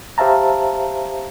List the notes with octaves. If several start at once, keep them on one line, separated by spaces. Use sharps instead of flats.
G4 C5 E5 F5 A5 A#5